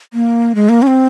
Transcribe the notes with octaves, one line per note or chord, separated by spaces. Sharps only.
A#3
G#3
A#3
C#4
C4